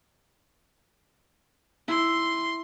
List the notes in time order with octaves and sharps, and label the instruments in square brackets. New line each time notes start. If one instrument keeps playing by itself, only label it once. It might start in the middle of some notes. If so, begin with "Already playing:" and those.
[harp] E4 [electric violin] C6